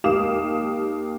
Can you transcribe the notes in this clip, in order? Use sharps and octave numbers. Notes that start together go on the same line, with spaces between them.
D#2 G4 F5 D6 D#6 E7